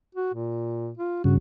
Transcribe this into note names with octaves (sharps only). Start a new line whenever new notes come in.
F#4
A#2
F4
G2 C#3 F#4